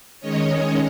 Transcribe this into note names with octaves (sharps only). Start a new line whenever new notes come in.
D#3 G#3 C#4 C#5 D#5